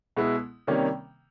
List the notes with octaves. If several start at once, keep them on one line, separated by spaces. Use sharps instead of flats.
B2 G#3 B3 E4
C3 D#3 G3 A#3 C#4